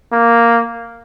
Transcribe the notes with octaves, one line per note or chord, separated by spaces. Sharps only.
A#3